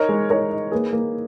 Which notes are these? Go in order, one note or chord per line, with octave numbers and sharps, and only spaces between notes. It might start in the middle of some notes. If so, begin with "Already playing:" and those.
Already playing: D#4 A#4 C#5
G#3
D#4 A#4 C#5
D#4
A#3 G#4 B4
A#3